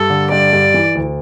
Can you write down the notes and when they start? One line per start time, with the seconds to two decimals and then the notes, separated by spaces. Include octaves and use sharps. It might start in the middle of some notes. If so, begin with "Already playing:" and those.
Already playing: G2 A4
0.10 D3
0.31 G2 D5
0.53 G2
0.74 E3
0.95 D2